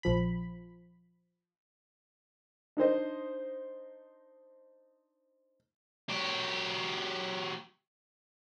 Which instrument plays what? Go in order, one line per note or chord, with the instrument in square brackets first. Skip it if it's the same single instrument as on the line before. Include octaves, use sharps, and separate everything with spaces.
[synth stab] A#1 F3 B5
[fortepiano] D4 D#4 C5 D#5
[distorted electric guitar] F#3 G4